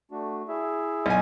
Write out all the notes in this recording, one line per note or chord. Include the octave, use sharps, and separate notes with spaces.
A3 D4 F#4
E4 G#4 E5
B1 G#5